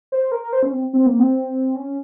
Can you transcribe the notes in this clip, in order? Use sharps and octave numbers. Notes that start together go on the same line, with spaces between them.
C5
A#4
A#4
C5
C#4
C4
C4
A#3
C4
C#4